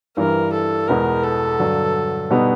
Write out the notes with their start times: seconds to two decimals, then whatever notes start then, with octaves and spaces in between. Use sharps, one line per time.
0.17 G2 E3 G3 A#4
0.53 A4
0.88 E2 B2 G#3 B3 A#4
1.24 A4
1.59 G2 D3 F#3
2.31 B2 G3 B3 D#4